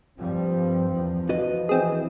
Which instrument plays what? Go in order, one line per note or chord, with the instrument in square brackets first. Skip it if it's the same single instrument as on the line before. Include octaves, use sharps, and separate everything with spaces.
[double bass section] G2 F3 G3 [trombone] C4
[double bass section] E2 F3
[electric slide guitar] F#4 B4 D#5
[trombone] E3 [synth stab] C4 G#4